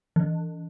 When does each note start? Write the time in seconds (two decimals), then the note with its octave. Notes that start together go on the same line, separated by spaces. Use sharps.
0.16 E3